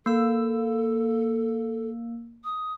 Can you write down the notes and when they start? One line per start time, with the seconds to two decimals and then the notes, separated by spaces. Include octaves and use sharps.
0.06 A#3 A4 E6
2.44 D#6